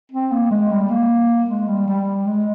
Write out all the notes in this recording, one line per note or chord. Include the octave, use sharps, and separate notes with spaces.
C4
A#3
G#3
G3
A#3
G#3
G3
G3
G#3